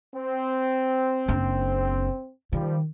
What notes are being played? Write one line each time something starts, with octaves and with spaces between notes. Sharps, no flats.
C4
F#1 D4
D#3 F3 G3